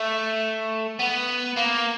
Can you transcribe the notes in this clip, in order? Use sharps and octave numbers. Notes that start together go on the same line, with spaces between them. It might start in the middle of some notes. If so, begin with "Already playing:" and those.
Already playing: A3
B3
A#3